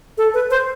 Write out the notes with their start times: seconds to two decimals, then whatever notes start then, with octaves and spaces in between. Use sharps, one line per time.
0.17 A4
0.34 B4
0.50 C5